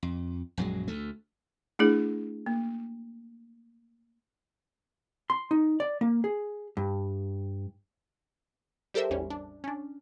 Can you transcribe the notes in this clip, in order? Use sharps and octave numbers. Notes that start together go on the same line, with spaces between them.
F2
A#1 F#2 F#3 G#3
D2 A3
A3 D4 E4 G#4
A#3
C6
D#4
D5
A#3
G#4
G2
G3 G4 A4 A#4 C5 E5
A1 E2 G3 C#4
D4
C#4 D4